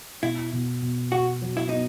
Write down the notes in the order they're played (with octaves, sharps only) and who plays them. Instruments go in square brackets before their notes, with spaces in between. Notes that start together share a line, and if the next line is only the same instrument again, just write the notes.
[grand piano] B2 [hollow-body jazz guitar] E4
[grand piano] B2
B2
[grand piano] B3 [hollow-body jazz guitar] F#4
[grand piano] F#3
[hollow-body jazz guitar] E4
[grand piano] B3 [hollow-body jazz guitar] D#4